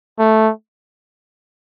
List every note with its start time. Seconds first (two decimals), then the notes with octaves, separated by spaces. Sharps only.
0.19 A3